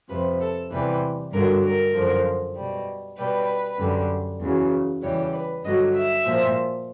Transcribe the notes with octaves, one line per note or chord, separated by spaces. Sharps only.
F2 C3 F3 B4
A4
E2 C3 E3 G3 B4
G2 D3 F#3 A#4
A#4
F#2 D3 F3
B2 G3
B2 G3 B4
F#2 D3 G3
E2 C#3 F#3
E2 C#3 E3 G3 C#5
B4
G2 D3 F#3 D#5
E5
A#2 F3